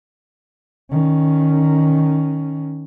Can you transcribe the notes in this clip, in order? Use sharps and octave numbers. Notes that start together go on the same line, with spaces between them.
D#3 C#4